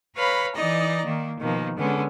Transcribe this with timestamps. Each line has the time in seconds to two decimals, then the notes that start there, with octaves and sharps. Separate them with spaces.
0.16 B4 C#5 F5 A#5 B5
0.54 E3 D#4 D5 D#5 A#5
1.04 D#3 A#3
1.40 B2 D#3 F3 A#3
1.78 D3 G#3 B3 C#4